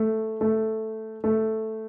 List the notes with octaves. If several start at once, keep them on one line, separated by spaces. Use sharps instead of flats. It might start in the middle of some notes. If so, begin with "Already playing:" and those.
Already playing: A3
A3
A3